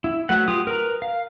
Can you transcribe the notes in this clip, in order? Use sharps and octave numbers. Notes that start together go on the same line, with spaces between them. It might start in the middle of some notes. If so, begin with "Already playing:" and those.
E4
F#3 A3 B4 F#5
F4 G4 D#6
A#4 B4 A#5
F5